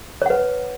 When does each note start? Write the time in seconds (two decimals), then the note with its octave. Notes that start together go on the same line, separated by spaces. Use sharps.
0.22 C#5
0.26 F#5
0.30 B4